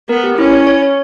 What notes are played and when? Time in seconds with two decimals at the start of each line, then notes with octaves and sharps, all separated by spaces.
0.09 B3 A#4
0.24 G4
0.38 C#4 E4
0.53 C#5
0.67 C#5
0.83 C#5